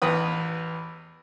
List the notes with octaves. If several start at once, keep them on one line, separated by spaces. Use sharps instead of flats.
A1 E2 B4 D#6